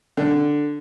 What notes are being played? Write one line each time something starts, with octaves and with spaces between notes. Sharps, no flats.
D3